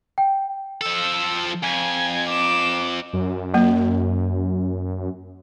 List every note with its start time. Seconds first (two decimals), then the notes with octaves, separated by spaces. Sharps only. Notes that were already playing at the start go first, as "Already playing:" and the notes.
0.18 G5
0.81 F3 A4 E6
1.63 F2 G#5
2.30 D6 E7
3.13 F#2
3.54 F#3 A#3